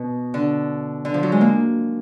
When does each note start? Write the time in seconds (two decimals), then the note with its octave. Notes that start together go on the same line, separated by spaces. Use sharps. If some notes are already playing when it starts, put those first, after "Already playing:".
Already playing: B2
0.34 D3
1.05 D3
1.14 F3
1.23 F#3
1.32 G#3
1.41 A#3